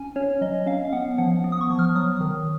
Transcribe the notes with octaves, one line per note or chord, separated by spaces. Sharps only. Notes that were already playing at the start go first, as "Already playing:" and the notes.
Already playing: C#4 G#5
C#4 C#5
F#3 D#5
C#4 F5
F5
B3 F#5
F3 F#5
B3
D#6
C#6
F3
F6
F#3 D#6
D#3